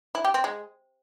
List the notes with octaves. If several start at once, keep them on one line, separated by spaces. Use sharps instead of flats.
E4
G4
C4
G#3